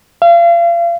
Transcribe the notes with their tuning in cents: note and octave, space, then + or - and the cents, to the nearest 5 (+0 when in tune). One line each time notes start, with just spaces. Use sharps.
F5 -35